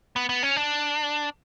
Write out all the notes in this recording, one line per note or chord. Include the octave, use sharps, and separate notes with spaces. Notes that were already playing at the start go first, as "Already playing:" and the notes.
B3
B3
C#4
D4